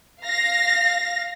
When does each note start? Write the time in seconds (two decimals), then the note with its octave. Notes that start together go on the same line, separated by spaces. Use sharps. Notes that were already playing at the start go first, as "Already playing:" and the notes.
0.23 F5 A#6